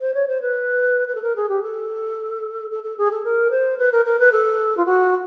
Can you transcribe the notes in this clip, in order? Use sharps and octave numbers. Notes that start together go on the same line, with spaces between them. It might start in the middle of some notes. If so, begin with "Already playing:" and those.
C5
C#5
C5
B4
B4
A4
A#4
G#4
G4
A4
A4
A4
G#4
A4
A#4
C5
B4
A#4
A#4
B4
A4
F4
F#4